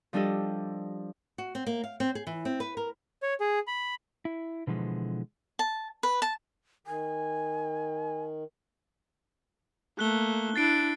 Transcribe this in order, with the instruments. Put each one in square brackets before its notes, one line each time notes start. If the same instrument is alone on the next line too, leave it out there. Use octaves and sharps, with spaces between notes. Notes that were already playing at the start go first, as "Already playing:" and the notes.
[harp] F3 G3 D4 G4 A4 D#5
[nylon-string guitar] F#4
C4
A#3
F5
C4
G#4
E3
C4
B4
A#4
[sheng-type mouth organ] C#5
G#4
B5
[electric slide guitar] E4
B2 D3 E3 F3 G#3
[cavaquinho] A5
B4
A5
[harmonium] D#3 [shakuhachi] G#5
[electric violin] A3 A#3 [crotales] F#6 G7
[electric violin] D4 E4 [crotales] A6 C7 D7